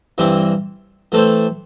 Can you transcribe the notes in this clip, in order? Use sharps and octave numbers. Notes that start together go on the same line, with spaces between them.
G2 E3 C4 E4
E3 A3 C4 A4 C5